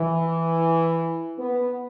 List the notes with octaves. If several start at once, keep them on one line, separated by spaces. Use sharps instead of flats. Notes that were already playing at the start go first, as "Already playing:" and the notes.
Already playing: E3
B3